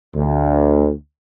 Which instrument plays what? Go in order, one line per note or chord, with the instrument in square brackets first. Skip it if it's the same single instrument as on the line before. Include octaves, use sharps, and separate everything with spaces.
[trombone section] D2